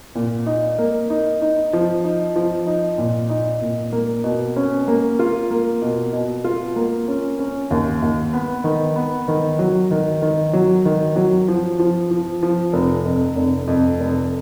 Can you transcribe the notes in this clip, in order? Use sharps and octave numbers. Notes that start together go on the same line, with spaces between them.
A#2
D#4
A#3
D#4
D#4
F3
D#4
F3
D#4
A#2
D#4
A#2
A#3
B2
C#4
A#3
F4
A#3
B2
B2
F4
A#3
C#4
C#4
D#2
D#2
B3
D#3
B3
D#3
F#3
D#3
D#3
F#3
D#3
F#3
F3
F3
F3
F3
F1
F2
F1
F2
F1